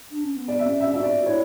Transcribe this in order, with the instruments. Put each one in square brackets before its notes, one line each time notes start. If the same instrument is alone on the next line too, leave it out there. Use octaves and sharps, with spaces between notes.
[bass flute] D4
C#4
B3
[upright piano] D5
E5
[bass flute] C#4
[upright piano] E5
[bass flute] F#4 [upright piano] E5
[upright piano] D5
[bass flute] E4 [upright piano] C#5